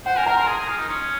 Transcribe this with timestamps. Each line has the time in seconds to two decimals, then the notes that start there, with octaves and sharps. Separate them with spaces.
0.06 C5 F#5
0.16 A#4 G#5
0.26 A#4 A#5
0.37 A#4 C6
0.47 G#4
0.58 G#4
0.68 F4
0.79 D#4
0.89 C#4